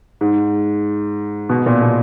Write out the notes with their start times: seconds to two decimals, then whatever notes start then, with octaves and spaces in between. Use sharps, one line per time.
0.21 G#2
1.49 B2
1.66 A#2
1.82 B2